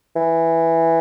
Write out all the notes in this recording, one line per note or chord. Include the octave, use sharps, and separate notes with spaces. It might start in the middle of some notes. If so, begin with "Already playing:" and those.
E3